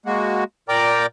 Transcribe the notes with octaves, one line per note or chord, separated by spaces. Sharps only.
G#3 A#3 F#4
A#2 A#4 D5 G5 A#5 D6